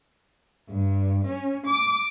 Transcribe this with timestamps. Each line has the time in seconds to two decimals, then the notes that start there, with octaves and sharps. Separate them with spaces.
0.70 G2
1.27 C#4
1.66 D6